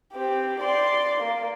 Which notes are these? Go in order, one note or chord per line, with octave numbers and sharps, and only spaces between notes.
C4 G4
D5 C6
A#3